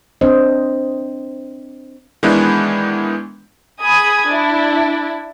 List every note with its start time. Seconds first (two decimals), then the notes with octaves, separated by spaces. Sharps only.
0.21 C4 D4 C5 D#5
2.23 D#3 E3 G#3 B3 D4 E4
3.82 G#4 B5 D#6 G#6
4.27 D4 E4